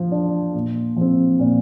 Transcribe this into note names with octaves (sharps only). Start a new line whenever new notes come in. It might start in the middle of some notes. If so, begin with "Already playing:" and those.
Already playing: F3
D4
A#2
F3 C4
A#2